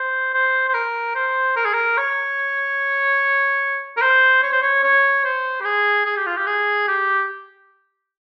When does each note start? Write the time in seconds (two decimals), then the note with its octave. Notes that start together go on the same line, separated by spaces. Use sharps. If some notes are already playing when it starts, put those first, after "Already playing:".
Already playing: C5
0.34 C5
0.68 C5
0.74 A#4
1.15 C5
1.56 A#4
1.65 G#4
1.74 A#4
1.98 C#5
3.97 A#4
4.02 C5
4.43 C#5
4.53 C5
4.62 C#5
4.83 C#5
5.25 C5
5.61 G4
5.65 G#4
6.06 G#4
6.16 G4
6.26 F4
6.37 G4
6.47 G#4
6.88 G4